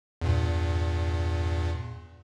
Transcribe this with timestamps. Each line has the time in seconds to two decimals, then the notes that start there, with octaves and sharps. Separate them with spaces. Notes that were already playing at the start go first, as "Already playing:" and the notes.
0.21 E2 G2 A#2